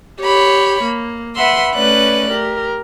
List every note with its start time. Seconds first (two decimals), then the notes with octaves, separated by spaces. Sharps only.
0.21 G4 C#5 B5
0.83 A#3
1.36 B4 E5 F#5 B5 C6 E6
1.74 A3 C#4 B4 D5 F#6
2.31 G4 A#4